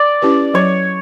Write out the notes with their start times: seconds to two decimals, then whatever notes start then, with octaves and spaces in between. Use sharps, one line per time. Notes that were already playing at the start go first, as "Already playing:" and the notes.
Already playing: D5
0.22 C#4 E4 G4 B4
0.54 F#3 C#5